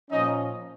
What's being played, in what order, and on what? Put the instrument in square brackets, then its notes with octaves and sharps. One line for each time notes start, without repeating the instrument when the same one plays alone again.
[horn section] A#2 F3 C#4 D#4 D#5